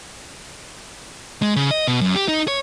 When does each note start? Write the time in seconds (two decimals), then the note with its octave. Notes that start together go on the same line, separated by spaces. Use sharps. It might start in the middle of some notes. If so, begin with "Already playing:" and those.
1.42 G#3
1.56 C#3
1.71 D#5
1.87 B2
2.01 F#2
2.15 G4
2.28 D#4
2.48 C#5